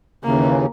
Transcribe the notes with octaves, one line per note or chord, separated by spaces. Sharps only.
D#2 C#3 E3 A#3